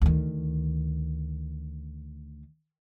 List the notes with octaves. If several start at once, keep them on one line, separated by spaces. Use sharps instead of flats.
D2 D#3